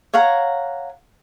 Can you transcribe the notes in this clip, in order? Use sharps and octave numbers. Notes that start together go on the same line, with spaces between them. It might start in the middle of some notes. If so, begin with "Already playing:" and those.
C#5 F5 F#5 A#5